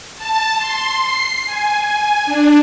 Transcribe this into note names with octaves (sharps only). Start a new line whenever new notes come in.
A5
C6
C7
G#5
D4